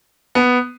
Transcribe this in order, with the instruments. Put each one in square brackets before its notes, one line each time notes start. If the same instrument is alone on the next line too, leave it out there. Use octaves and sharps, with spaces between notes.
[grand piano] B3